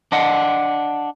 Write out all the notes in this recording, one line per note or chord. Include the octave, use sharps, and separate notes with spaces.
D4 D#5 F#5